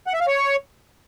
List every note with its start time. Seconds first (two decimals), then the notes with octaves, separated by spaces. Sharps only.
0.07 F#5
0.14 E5
0.21 F5
0.27 C#5